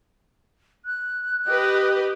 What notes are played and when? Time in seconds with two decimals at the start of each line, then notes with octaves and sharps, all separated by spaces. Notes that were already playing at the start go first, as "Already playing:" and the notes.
0.85 F#6
1.47 G4 B4 D#5